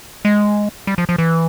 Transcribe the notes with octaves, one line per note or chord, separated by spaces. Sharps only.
G#3
G3
F3
F3
E3